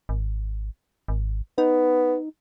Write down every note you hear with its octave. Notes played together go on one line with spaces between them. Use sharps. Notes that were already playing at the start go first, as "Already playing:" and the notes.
G#1
G#1
B3 D#4